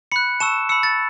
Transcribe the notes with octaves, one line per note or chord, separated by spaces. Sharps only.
B5 F#6 C#7
A5 C#6 E6 E7
B5 E6 C#7
A6